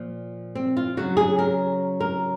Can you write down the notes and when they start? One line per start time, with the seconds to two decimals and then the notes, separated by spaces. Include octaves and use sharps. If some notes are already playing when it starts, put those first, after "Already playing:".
Already playing: A#2 F3
0.55 C4
0.77 F4
0.97 C#3 F#3 F#4
1.17 G#4
1.39 A#4
2.00 A#4